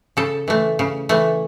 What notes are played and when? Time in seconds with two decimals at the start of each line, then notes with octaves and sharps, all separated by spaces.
0.17 C#3 A4
0.48 E3 A3
0.79 C#3
1.09 E3 A3